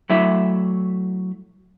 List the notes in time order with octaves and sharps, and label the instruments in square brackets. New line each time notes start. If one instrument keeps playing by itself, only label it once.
[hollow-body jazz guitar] F#3 A3 E4 E5